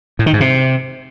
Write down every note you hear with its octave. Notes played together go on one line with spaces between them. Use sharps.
A2
D#3
G#2
C3